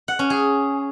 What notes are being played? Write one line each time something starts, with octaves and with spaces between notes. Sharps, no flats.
F#5
C#4
G#4